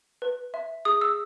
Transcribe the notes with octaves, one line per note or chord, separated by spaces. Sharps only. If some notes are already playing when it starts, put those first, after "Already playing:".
B4
E5
G#4 D#6
E6